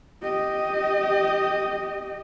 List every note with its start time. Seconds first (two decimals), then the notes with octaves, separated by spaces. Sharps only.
0.23 G4 D#5